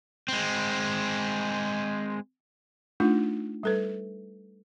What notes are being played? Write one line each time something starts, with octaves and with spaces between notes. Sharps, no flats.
G#3 C4
A3 D4 D#4 F4
G3 A4 B4